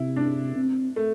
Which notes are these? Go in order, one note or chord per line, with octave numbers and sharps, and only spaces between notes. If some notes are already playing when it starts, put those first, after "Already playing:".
Already playing: C3 E4
D4
C4
A3